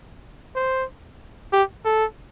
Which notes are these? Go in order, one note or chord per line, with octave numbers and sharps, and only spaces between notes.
C5
G4
A4